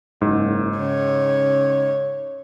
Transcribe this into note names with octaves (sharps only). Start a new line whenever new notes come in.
F#1 G#2
C#3 C#5